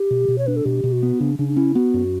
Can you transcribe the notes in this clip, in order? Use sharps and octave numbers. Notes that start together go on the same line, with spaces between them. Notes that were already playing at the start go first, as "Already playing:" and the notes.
Already playing: G4
B2
B2
C#5
D4 B4
A4
B2 G4
B2
F#4
B3
C#3 D4
C#3 D4
D4
C#4 E4
B3 F#4
F#2